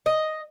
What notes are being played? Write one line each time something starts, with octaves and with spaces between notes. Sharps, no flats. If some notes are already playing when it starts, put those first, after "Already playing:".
D#5